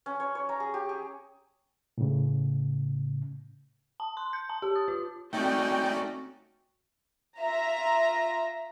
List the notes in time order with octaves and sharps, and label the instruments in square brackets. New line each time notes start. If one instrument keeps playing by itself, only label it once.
[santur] C#4
C#5
C#5
A#5
G#4
G4
G#4
[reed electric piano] A2 C#3
[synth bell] A5
C6
G6
A5
G4
D#6
F4
[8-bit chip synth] A3 D#4 D5 [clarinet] C4 [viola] C#4 F#4 [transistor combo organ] G5
[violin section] F4 E5 A#5